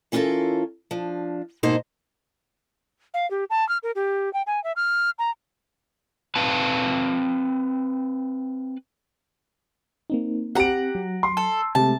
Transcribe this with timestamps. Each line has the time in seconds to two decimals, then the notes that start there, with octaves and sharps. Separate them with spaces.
0.12 E3 C#4 F4 F#4 A4 A#4
0.91 F3 D4
1.63 G#2 B2 A#3 D#4 C5 A5
3.14 F5
3.31 G4
3.50 A5
3.69 F6
3.83 A#4
3.95 G4
4.33 G5
4.47 G#5
4.64 E5
4.76 F6
5.19 A#5
6.36 C4 B4 F5 A5
10.10 A#3 C4 D#4
10.55 C4 G4 F#5 A#5 D7
10.95 F#3
11.23 C6
11.37 A4
11.75 C3 G#3 A3 A5